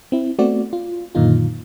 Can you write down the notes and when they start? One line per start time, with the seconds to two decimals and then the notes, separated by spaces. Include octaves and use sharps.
0.12 C4 E4
0.39 A3 B3 C4 F#4 D5
0.73 F4
1.15 F#2 A#2 D3 D#3 D#4 F4